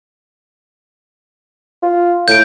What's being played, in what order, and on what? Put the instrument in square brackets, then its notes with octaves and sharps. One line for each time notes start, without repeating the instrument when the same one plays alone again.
[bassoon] F4
[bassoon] A2 [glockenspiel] G6 D7